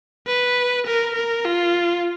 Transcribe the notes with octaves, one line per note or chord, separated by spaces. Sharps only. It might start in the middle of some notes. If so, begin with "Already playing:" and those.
B4
A#4
A#4
F4